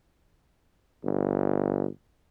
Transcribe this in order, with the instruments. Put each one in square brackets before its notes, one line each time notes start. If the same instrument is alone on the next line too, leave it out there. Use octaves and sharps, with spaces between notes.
[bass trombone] G1